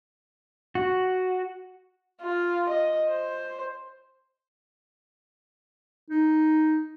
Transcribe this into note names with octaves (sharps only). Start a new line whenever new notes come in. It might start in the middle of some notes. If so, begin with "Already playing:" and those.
F#4
F4
D#5
C5
D#4